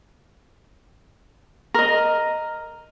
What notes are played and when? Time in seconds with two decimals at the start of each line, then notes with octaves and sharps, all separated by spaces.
1.74 A#4 D#5